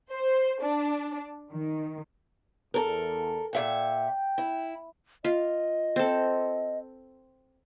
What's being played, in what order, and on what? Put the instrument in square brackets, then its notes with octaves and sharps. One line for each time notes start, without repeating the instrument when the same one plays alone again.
[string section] C5
D4
D#3
[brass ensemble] E2 [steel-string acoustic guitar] A4 A#4
[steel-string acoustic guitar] A#2 E5 F#5 [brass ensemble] G5
[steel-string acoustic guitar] E4
[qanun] F4 [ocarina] D#5
[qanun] C4 A4